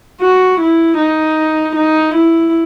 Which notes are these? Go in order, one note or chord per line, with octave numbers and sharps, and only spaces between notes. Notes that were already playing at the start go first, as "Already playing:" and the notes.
F#4
E4
D#4
D#4
E4